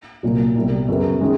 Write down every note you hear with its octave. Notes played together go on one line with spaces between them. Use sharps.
C2 A#2 F#3
C2 B2 G3
F#2 C#3 F#3 B3
D#3 G#3 C#4